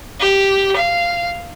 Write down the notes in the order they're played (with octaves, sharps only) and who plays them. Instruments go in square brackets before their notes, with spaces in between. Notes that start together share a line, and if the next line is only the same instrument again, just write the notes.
[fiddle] G4
F5